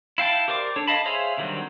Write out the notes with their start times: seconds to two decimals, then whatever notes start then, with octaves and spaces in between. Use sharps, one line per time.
0.18 E4 F5 G5 A5
0.48 G4 A#4 C5 D5 D6
0.76 D4 A4 C#5
0.88 D#5 F5 A5 B5
1.05 G#4 C5 C#5 E5 F5
1.37 D3 D#3 F#3 G3 C4